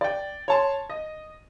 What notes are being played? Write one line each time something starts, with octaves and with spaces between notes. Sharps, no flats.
D5 G5
C#5 A5 C6
D#5